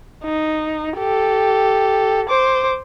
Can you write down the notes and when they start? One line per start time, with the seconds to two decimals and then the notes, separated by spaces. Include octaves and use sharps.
0.24 D#4
0.98 G4 A4
2.29 C5 D6